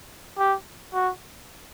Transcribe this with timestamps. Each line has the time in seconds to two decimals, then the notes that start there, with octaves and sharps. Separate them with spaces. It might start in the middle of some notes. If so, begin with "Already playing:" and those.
0.38 G4
0.93 F#4